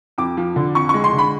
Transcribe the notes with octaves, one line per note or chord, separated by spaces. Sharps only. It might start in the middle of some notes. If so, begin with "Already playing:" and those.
F2 D6
F3
D3
F2 C#6
G#3 C#6
C6
D3
B5